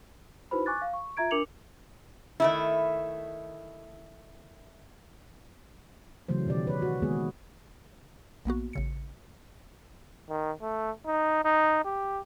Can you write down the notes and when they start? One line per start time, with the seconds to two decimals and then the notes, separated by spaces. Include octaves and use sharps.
0.51 D#4 E4 F#4 B4 C5 B5
0.66 G#5 C#6 D6 F#6 A6
0.82 F5
0.94 C#6
1.17 F4 E5 A#5 G#6 D7
1.31 D4 A#4 D6 C#7 F7 F#7
2.40 D#3 A3 E4
6.29 C#3 E3 F#3 A3 C5
6.47 B2 D#3 G4 D5
6.67 B4 C#5
6.82 F#4
7.02 D#3 G#3 A#3 B3 G#4
8.45 A#1 A#3 B3 F#4
8.73 A1 C#3 C#7
10.29 D#3
10.62 A3
11.06 D#4
11.45 D#4
11.85 G4